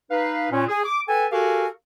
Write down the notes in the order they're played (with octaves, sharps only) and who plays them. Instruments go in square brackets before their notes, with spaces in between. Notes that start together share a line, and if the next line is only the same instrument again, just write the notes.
[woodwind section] D#4 B4 F5
A#2 C#4
G#4
D6
A4 B4 G5 G#5
F#4 G4 A4 A#4 F5 G#5